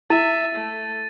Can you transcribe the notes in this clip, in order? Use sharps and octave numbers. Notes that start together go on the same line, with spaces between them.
E4 E5 A6 D#7
A3